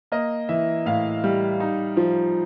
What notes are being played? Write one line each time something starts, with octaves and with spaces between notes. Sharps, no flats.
A#3 D#5
E3 E5
A2 F5
G3
D#4
F3